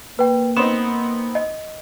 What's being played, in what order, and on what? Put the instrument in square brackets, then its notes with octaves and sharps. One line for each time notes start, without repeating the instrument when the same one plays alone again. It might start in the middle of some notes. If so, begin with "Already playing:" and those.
[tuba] A#3 [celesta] B4 G5
[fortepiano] B3 C4 D#4 [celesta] E7
[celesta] D#5